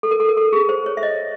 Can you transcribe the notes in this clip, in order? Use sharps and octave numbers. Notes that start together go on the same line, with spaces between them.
A4
A#4
A4
A#4
A4
G#4
C5
C#5
E5
D#5